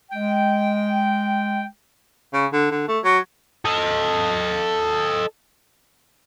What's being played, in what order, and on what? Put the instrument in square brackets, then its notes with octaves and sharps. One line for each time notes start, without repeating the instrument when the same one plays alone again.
[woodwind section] G#3 G5
[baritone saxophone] C#3
D3
D3
A3
F#3
[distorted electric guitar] A4 D#5